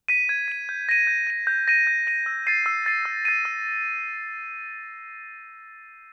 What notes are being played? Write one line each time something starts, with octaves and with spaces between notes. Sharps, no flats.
B6 D#7
G#6
B6 D#7
G6
A#6 D#7
G6
A#6 D#7
G6
A#6 D#7
G6
A#6 D#7
E6
A6 C7 D#7
E6
A6 C7 D#7
E6
A6 C7 D#7
E6